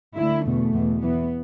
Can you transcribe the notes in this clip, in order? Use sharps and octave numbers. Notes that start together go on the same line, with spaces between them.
D2 D3 E4
E2 B2 A3
E2 B2
E2 E3 B3